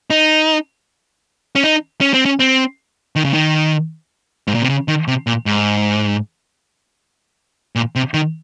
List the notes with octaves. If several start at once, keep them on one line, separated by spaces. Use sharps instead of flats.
D#4
C#4
D#4
C#4
C4
C#4
C4
D#3
C#3
D#3
G#2
A#2
C3
C#3
D#3
C3
A#2
G#2
A#2
C3
D#3